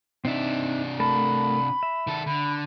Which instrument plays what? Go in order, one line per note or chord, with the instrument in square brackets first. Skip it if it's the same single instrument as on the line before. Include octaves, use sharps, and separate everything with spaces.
[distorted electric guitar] C3 D4 [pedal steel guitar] C4 D#4 E5
[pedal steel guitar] A3 A#4 A5 [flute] B5
[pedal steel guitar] E5
[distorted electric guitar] D#3 A4
[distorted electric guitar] D3 [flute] B5